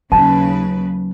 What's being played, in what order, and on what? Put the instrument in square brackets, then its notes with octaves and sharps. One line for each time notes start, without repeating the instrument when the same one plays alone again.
[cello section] D#2 C#3 B4 [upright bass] F#3 [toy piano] A5